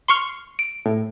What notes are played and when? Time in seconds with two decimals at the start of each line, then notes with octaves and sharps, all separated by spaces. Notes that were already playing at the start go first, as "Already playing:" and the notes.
0.08 C6 C#6 F6
0.59 D7
0.86 A2